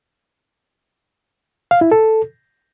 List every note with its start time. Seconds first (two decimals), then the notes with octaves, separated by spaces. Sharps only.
1.71 F5
1.81 E4
1.92 A4